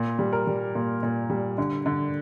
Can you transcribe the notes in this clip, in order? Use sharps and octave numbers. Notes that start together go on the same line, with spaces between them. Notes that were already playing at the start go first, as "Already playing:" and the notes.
Already playing: A#2
G3
A#4
G3
A#2
A#2
G3
D3
D3